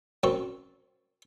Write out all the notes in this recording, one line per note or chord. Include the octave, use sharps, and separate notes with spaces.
F#2 C4 C#6